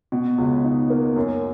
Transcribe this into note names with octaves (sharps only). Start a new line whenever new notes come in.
B2
C#2
D#4
A#3
F#2